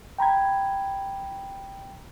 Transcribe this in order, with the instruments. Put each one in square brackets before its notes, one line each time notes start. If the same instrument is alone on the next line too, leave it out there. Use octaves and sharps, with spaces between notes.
[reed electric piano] G5 A#5 B5 G#6